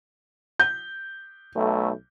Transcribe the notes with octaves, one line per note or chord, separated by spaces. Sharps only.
G6
B1 A3